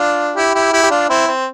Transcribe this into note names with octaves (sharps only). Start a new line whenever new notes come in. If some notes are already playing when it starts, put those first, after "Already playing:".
Already playing: D4 F4
E4 G4
E4 G4
E4 G4
G4
D4 F4
C4 E4
C4